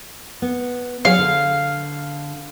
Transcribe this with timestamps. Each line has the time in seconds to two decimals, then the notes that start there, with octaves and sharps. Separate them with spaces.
0.42 B3
1.05 F#3 G#4 C#5 F5
1.19 D3